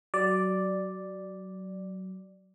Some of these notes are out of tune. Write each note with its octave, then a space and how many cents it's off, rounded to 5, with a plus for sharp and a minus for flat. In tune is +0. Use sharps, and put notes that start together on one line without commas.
F#3 +20 D5 +0